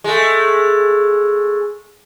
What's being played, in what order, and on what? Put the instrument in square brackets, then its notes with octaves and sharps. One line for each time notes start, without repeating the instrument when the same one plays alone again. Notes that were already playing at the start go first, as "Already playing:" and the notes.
[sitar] G#3 A3